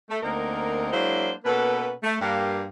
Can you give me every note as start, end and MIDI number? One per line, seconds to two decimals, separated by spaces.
0.10 0.18 57
0.23 0.91 38
0.23 0.91 58
0.23 0.91 60
0.23 0.91 63
0.23 0.91 70
0.92 1.31 54
0.92 1.31 56
0.92 1.31 58
0.92 1.31 62
0.92 1.31 64
0.92 1.31 72
1.45 1.90 47
1.45 1.90 58
1.45 1.90 61
1.45 1.90 69
1.45 1.90 71
2.03 2.16 57
2.21 2.65 43
2.21 2.65 58
2.21 2.65 67